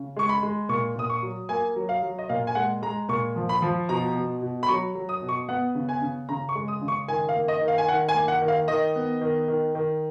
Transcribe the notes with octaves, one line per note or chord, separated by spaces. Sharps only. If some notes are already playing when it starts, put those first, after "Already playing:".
Already playing: C#3
G#3 C#6
B5
G#3
A#2 C#6
A#2 D#6
C#6
F#3
A#3 G#5
F#3
F5
F#3
D#5
A#2 F5
G#5
G#3 F#5
G#3 A#5
A#2 C#6
F3
B5
F3
B2 A#5
B2
B2
B5
F#3 C#6
F#3
D#6
B2
C#6
B3 F#5
C#3
G#5
C#3
C#3 A#5
C#6
G#3
D#6
C#3
C#6
D#3 G#5
F5
A#3
D#5
D#3
F5
G#5
D#3 F#5
G#5
A#3
F#5
D#3
F5
D#3 D#5
B3
D#3
D#3
D#3